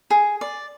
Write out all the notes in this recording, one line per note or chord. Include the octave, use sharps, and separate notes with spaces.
G#4
D5